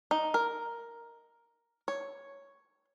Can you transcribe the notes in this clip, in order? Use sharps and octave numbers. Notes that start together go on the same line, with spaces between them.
D#4
A#4
C#5